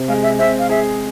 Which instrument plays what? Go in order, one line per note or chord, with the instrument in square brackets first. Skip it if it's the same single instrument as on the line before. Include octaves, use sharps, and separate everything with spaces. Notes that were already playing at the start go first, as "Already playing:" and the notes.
Already playing: [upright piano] C3
[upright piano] G#3 [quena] F5
[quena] E5
[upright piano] C4 [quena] E5
[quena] F5
[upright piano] G#4 [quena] E5